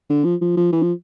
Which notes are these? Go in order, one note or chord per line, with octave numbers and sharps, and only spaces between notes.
D3
F3
F3
F3
E3
F3